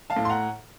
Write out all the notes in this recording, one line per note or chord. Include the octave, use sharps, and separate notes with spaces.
F5 A5
A2
C6
F#5 A#5